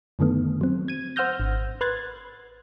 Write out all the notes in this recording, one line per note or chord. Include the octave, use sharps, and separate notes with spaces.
F#2 D3 D#3 A3 B3
F#3 C4
G#6 D#7
C5 F#5 E6 F6 G6 A#6
G#1
B4 C6 F#6 G#6 A6